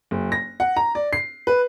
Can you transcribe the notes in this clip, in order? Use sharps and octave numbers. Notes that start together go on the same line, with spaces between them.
F#1
A#6
F#5
A#5
D5
C7
B4